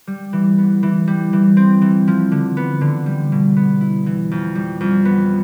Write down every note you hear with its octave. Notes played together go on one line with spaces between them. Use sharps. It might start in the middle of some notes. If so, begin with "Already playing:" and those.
G3
E3
B3
E3
G3
E3
C4
E3
F3
D3
B3
D3
G3
B2
B3
E4
E3
F2
G3
F2
B3